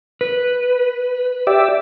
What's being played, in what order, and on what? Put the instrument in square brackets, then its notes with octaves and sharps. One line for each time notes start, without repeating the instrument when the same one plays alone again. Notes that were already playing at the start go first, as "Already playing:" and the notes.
[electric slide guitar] B4
[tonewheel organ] G4 D5 E5